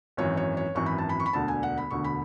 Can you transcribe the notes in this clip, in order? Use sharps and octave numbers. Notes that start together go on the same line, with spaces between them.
G#1 F#2 E3 C#5
C#5
C#5
G#1 F#2 E3 C#6
B5
A5
B5
C#6
B5
E1 D2 D3 A5
G#5
F#5
B5
E1 D2 D3 C#6
B5